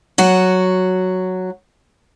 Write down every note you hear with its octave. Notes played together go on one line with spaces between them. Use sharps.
F#3 F#4